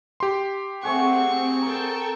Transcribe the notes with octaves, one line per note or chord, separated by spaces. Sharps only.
G4 C6
A3 C4 G#4 F#5 C#6
A4 A#4 G5 A5 A#5